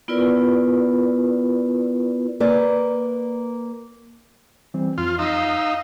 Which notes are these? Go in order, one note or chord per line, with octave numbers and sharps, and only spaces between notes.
B3 E4 F4 A#4 B4 D5
A#3 B4 D5
E3 G3 C4
F2 F4
D#4 D#5 F5 E6